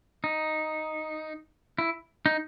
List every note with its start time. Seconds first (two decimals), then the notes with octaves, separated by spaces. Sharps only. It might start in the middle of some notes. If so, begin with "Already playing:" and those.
0.24 D#4
1.78 E4
2.26 D#4